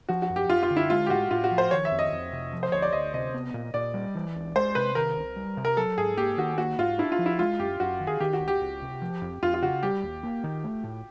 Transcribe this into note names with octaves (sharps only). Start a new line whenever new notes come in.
F3 F#4
F#4
F#2
G4
F#2 F4
F4
D3
E4
G#3 F4
G4
A2 F#4
A2 F4
F#4
F3
C5
D#3 C#5
E5
F2
D#5
F2
C3
F3
C5
D2 C#5
D5
D2 D#5
C3 D#5
B3
A#2
A#2 D5
G3
E3
C#2
G#3 C5
C3 B4
D#3 A#4
C2
G3
C3
A#4
F#3 A4
G#2 G#4
A#3 G4
D#3 F#4
A#3 F#4
G#2 F4
D4 E4
F4
F3
E4
G#3 F4
F#2 G4
F#2 F#4
D#3
G#4
D#3 G4
F#4
C#2
G4
C#2
C3
F3
F2
F2 F4
F4
C#3 F#4
G3 G4
D#2
A#3
D#3
A3
A2